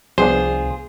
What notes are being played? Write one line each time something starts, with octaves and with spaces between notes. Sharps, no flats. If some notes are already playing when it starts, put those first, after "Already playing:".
C2 F3 B3 D4 F4 G#4 C5